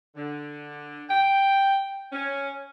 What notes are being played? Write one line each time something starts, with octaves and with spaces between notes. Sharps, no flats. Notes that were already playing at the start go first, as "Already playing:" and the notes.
D3
G5
C#4